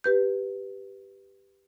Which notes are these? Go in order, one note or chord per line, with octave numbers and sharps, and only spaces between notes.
G4 B4 G6